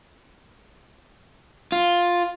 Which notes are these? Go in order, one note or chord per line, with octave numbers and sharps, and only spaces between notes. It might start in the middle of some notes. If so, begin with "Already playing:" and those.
F4